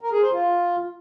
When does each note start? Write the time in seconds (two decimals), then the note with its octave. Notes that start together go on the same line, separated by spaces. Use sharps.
0.01 A#4
0.12 G#4
0.22 C5
0.33 F4